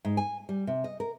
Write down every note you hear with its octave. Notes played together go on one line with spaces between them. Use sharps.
G#2
G#5
G3
C3
D#5
A#4